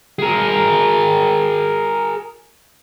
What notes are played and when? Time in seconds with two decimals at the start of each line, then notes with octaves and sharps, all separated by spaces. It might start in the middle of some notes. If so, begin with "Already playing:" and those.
0.19 G#4 A#4